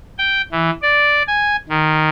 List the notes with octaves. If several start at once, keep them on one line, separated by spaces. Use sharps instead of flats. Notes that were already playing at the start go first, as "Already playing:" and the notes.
G5
E3
D5
G#5
D#3